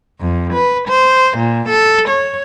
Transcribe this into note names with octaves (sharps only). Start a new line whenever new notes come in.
F2
B4
C5
A#2
A4
C#5